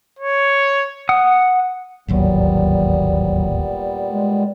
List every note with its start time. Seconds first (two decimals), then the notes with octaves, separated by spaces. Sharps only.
0.19 C#5
1.09 F#5 D#6
2.08 D1 G#1 D#2 A#2 F#3 G3 B3
4.11 G#3